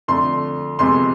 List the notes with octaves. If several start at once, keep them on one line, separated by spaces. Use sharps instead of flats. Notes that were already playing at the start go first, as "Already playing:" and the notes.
F2 D3 A3 C6
F2 C3 G#3 B3 C6